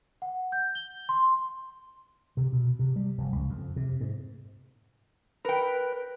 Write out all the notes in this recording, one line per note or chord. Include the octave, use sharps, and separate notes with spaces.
F#5
G6
G7
C6
C3
B2
C3
G3
F1
C#2
F2
C3
G#2
A#4 B4 G5